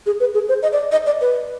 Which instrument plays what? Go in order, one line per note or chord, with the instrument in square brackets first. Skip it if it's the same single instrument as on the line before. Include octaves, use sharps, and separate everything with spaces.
[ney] G#4
B4
G#4
C5
D#5
D5
D#5
D5
B4